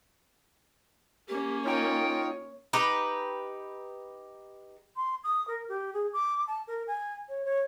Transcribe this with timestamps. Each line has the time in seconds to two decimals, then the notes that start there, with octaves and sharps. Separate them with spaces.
1.28 A#3 C#4 G4
1.66 D#4 F4 C#5 G5
2.73 D#4 G4 B4
4.96 C6
5.24 D#6
5.48 A#4
5.69 G4
5.94 G#4
6.13 D6
6.47 A5
6.68 A#4
6.87 G#5
7.29 C#5
7.45 C#5